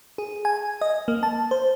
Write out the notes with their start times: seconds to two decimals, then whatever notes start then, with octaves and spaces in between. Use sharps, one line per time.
0.18 G#4
0.45 G#5
0.81 D#5
1.08 A#3
1.23 A5
1.51 C5